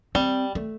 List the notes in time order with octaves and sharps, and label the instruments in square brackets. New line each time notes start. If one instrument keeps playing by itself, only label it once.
[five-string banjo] G3 [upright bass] C4
[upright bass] A3